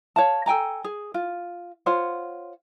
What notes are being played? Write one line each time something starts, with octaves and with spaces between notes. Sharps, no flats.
C#5 F5 A5
A4 G5 G#5 A#5
G#4
F4
F4 C5 C#5 F#5